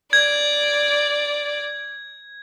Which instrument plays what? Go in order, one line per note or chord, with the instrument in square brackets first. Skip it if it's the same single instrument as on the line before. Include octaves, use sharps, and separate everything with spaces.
[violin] D5 [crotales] G#6